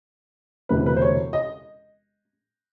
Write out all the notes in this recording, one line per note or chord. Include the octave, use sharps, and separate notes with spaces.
E1 D2 C3 E3 B4
B4
C5
C#5
D#5